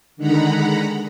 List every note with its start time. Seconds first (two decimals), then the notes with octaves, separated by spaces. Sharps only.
0.17 D3 D#3 G#3 F#5 A#5 B5